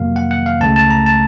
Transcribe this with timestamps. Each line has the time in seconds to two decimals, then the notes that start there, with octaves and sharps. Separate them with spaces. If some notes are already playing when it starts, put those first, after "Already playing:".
Already playing: F2 C3 F#3 A#3 F5
0.16 F#5
0.31 F#5
0.46 F5
0.60 C#2 C#3 A3 A5
0.76 A5
0.90 A#5
1.06 A5